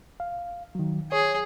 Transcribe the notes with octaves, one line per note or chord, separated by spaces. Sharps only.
F5
D#3 F#3
G#4 C#5